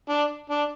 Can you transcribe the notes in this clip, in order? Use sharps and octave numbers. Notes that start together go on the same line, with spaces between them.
D4
D4